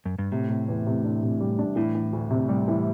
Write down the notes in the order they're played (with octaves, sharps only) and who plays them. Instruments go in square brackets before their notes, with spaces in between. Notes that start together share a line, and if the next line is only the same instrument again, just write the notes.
[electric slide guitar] F#2
G2
[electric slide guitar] A2 [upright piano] C3
[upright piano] C3
E2
C3
D4
C3
G3
D4
[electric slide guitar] A2 [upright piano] E3
[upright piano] E3
D2
C3
G3
E3